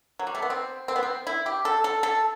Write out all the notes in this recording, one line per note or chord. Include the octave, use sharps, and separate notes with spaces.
F#3
G3
A3
B3
C4
C4
B3
C4
E4
G4
A4
A4
A4